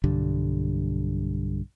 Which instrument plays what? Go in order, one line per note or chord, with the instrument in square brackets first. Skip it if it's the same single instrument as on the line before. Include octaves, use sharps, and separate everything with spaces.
[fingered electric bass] B1 G2 D3 G3